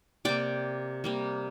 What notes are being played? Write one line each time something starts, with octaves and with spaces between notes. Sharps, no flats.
C3 A#3 D5 G5
C3 G3 A#3